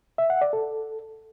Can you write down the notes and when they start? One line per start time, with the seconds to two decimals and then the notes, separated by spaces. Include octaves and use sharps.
0.18 E5
0.30 F#5
0.41 D5
0.53 A4